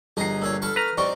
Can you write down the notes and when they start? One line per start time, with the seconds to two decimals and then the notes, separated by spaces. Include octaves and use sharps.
0.17 G1 D#4 G#4 A#5 C7
0.42 A#2 G#4 C#5 E6
0.62 A4 B5 C#6 F6
0.76 B4 A#5 F6
0.98 G3 C4 D#4 D5 C#6